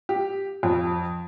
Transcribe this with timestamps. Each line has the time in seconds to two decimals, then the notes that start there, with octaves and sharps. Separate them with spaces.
0.09 G4
0.63 F2